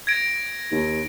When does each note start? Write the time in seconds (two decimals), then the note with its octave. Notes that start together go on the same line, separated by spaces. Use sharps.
0.07 G#6 A#6 D7
0.72 D#2